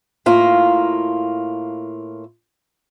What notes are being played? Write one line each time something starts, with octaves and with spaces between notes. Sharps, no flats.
A2 A#3 F4